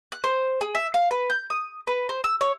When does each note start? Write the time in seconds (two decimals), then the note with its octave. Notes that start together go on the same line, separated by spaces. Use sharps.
0.12 F#6
0.24 C5
0.61 G#4
0.75 E5
0.94 F5
1.11 B4
1.30 G6
1.50 D#6
1.87 B4
2.09 C5
2.24 E6
2.41 C#5